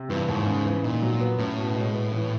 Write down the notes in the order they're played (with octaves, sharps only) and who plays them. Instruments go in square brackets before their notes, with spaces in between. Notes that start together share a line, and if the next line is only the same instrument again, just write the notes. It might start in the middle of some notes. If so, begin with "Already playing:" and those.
Already playing: [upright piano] C3
[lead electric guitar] G2 [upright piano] E3
[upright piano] D#2 [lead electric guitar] G#2
[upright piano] C#3
E3
[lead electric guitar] A#2 [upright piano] D#4
[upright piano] F#3
B3
[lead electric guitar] A2 [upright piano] C#4
[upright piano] B2
G#3
B3
E3